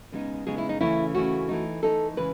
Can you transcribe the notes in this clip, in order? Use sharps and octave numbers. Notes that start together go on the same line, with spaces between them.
C#3 G#3 B3 D#4
C#3 G#3 B3 D#4 G#4
E4
D#4
C#3 E3 A3 C#4 E4
C#3 E3 A3 C#4 F#4
E3 A3 D#4
E3 A3 D#4 A4
C#3 E3 G#3 B4